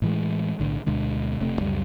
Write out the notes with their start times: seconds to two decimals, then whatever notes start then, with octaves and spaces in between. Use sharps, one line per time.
0.02 A2 E3 G#3
0.59 B1 A2 D3
0.86 D2 B2 D3 G#3
1.41 E1 C3 A3
1.61 C#2 F#2 G3